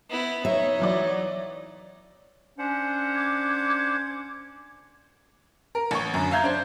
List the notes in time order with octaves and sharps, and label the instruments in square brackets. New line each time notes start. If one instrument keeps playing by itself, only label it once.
[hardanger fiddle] B3 E4
[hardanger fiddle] D#4 [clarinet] C#5 [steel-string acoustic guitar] E5
[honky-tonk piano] E3 F#3 D5
[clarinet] C#4 [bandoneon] D4 C5 F#5
[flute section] D6 G#6
[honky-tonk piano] A#4
A1 C#6
F#2 D3
E5 F5 A#5 G6 G#6
D4 C5